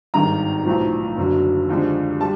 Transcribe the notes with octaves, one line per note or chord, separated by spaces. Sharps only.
G#1 G2 D#3 G#3 A#5
B1 A2 F3
F#1 F#2 D3 F#3
D#2 D3 F3 G#3
G3 A5